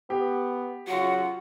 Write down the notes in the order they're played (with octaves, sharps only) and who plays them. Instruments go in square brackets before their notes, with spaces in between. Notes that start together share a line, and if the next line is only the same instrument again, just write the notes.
[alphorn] B3 [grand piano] G4
[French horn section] C#3 F4 F#4 [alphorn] F#3 [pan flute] F#5